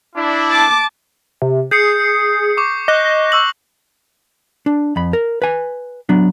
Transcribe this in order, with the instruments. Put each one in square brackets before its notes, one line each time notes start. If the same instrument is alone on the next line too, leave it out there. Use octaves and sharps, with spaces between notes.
[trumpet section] D4 E4
[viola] A5 D6
[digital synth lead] C3
[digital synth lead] G#4 [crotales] G6 C7 C#7
[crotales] C#6 D6
[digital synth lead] D#5 [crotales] D6 F#6 A#6
[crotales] C#6 E6 F#7
[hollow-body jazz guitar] D4
F2 B5
A#4
B4 G#5
F#3 B3 D4